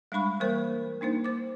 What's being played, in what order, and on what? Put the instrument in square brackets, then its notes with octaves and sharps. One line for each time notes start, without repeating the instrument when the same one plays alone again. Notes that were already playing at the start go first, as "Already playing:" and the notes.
[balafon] G3 G#3 D4 B5 C#6
E3 G3 A#3 A#4 C5
A#3 D4 D#4 C5
C5 D6